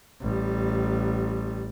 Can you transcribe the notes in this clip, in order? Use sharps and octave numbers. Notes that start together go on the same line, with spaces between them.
A1 G3